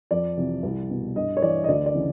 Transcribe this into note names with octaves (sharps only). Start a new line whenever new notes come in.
F2 D5
C3 E3
C2
B2
G2 D#5
C#5
E3 D5
D#5
D2 D5
D5
C#3 E3